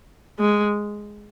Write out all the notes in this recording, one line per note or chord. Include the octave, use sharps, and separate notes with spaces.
G#3